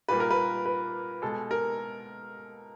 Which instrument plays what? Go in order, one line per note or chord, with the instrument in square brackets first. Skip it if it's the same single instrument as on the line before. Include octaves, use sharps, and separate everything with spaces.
[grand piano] A#2 G3 A#3 B4
A#4
B4
B4
B2 G#3 A4
A#4